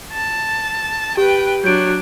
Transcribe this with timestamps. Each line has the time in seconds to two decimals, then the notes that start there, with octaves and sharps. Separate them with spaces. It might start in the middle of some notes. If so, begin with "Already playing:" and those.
0.13 A5
1.17 G4 B4 G5
1.64 F#3 D4 G6 D7